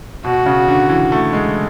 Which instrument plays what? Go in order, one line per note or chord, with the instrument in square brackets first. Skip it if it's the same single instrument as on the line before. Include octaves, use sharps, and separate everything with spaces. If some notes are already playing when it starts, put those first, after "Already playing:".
[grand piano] B2 [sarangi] F#4
[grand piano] C#3
D3
E3
A3
G#3